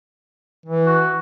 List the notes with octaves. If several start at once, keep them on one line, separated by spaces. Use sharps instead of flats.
E3
F#4